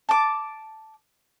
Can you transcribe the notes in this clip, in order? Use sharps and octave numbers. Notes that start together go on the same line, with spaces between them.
A5 D6